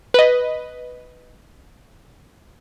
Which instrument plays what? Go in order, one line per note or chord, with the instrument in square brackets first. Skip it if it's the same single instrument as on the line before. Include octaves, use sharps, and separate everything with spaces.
[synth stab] B4 D#5